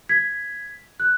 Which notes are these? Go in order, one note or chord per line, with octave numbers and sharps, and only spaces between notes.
G#6 B6
F#6